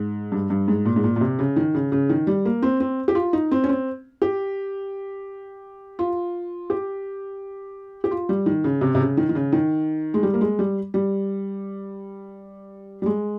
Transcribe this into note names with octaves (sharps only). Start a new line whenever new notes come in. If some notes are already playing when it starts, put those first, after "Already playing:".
Already playing: G#2
G2
G2
G#2
A#2
G#2
A#2
A#2
C3
C#3
D#3
C#3
C#3
D#3
G3
A#3
C4
C4
G4
F4
D#4
C4
C#4
C4
G4
F4
G4
G4
F4
G3
D#3
C#3
C3
C3
C#3
D#3
D#3
C#3
D#3
G#3
G3
A#3
G#3
G3
G3
G3
G#3